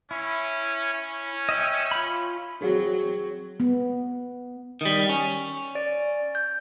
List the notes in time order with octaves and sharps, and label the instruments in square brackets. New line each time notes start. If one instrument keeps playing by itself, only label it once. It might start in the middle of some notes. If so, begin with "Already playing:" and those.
[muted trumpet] C#4 [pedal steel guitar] E4
[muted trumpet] C#4
[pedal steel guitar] D#5 E5 G5
F4 B5
[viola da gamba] F#3 C4 [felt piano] F#4 G#4
[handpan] B3
[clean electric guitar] D#3 G3
C#4
[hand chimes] D5 A6 D7
G6